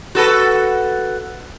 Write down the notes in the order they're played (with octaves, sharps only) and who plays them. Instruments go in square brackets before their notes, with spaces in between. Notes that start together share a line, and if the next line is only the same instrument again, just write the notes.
[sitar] F#4 A4 B4